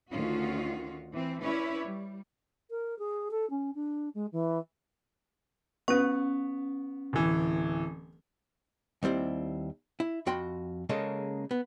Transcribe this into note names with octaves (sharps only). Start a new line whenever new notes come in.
D2 D#3 C#4 F4 F#4
E3 C4
C#4 E4 B4 C#5 D5
G3
A#4
G#4
A4
C#4
D4
G#3
E3
B3 C#4 C#6
D1 E3
D#2 G3 C4 E4
E4
F2 F#4 G5 B5 C6
C#3 G#3 A#3 C#4 A4
B3